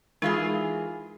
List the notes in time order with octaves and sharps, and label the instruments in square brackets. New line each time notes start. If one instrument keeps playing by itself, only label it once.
[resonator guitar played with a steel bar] E3 F4 G#4 [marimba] G#3 D#4 A#4